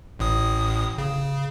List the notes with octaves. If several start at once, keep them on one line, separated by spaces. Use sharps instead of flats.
A1 A2 D#6
C#3